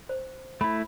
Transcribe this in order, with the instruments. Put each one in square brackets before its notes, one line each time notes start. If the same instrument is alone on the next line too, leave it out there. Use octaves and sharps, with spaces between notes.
[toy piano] C5
[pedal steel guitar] A3 E4 [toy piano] B5